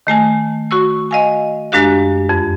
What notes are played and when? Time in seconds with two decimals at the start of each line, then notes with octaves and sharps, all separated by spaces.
0.07 D#3 A3 G#5 A5
0.71 F#4 C#6 E6
1.11 D#5 F5 G#5
1.72 F#2 G#3 D4 G4 F5 F#6
2.29 F2